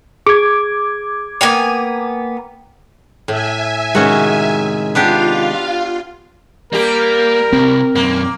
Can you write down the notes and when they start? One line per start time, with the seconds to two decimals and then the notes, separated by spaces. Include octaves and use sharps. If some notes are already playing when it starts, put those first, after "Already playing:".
0.27 G#4 D6 G#6
1.41 A#3 B3 G5 G#5 F7
3.28 A2 E5 G#5
3.95 C3 D#3 G#3 C#4 F#4
4.95 B3 D4 F4 G4 F5
6.73 G3 A#3 G4 A#4
7.52 C2 C4
7.95 B1 F#2 A#3